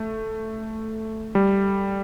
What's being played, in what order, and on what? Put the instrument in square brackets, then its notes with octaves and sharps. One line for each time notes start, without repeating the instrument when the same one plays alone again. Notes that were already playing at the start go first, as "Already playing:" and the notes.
Already playing: [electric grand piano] A3
G3